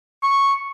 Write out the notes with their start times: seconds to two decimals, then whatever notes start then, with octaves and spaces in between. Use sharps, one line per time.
0.23 C#6